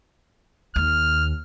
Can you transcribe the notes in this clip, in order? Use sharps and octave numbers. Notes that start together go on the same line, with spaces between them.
D#2 F6